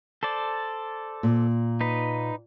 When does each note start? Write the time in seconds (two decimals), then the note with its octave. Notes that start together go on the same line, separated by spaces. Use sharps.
0.23 A4 C5 D5
1.23 A#2
1.81 D#4 B4